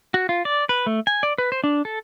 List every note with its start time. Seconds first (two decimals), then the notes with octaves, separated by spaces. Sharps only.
0.14 F#4
0.29 F4
0.45 D5
0.69 B4
0.86 A3
1.07 G#5
1.23 D5
1.38 B4
1.52 C5
1.64 D4
1.85 A4